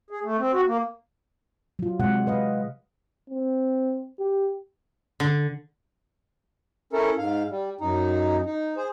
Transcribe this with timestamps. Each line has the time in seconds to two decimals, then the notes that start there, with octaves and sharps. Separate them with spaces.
0.10 G#4
0.24 A3
0.39 C4
0.53 F#4
0.67 A#3
1.79 F#3 F4
1.99 C3 G#3 F#5
2.27 B4 D#5 F5
3.30 C4
4.20 G4
5.20 D3
6.93 C#4 E4 A4 A#4
7.18 G#2 F5
7.51 G3
7.81 F#2 D#4
8.46 D#4
8.77 G#4 C5